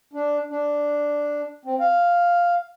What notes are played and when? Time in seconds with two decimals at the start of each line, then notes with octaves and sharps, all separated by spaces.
0.13 D4
0.50 D4
1.65 C4
1.80 F5